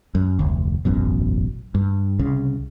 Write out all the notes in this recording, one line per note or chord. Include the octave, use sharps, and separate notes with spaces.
F#2
F1 D2
E1 A1 F#2 B2
G2
C2 C#3